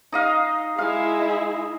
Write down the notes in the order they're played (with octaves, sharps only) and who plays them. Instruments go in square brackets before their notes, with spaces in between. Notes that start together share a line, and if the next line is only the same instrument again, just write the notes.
[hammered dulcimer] D#4 D#5 F5
[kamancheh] G#3 E4 [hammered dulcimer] F5